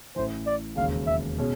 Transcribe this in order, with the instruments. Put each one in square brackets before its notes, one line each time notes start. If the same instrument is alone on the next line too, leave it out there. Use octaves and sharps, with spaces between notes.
[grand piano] A1 A2 E3 [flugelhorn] C5
[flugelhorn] D5
[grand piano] E1 D#2 C#3 [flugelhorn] F5
[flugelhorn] E5
[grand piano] B2 G#3 C#4